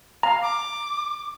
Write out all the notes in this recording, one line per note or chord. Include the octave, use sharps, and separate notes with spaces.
F5 A#5
D6